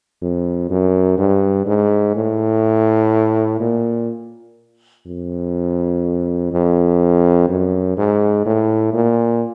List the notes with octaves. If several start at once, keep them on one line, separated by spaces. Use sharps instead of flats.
F2
F#2
G2
G#2
A2
A#2
F2
F2
F#2
G#2
A2
A#2